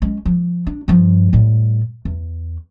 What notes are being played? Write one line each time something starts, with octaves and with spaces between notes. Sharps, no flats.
G#3 C#4
F3
D4
G2 F3
A2 G3
E2